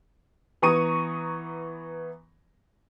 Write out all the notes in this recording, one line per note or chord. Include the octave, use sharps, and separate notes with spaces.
E3 B3 A#5 C#6 D#6 D#7